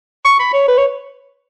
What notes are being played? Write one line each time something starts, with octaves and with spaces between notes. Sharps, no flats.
C#6
B5
C#5
B4
C#5